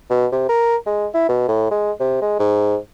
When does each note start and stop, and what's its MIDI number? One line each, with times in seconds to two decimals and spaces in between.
0.10 0.27 47
0.32 0.48 48
0.49 0.76 70
0.86 1.06 56
1.14 1.28 64
1.29 1.47 47
1.48 1.67 45
1.71 1.92 56
2.00 2.21 48
2.21 2.38 56
2.39 2.76 44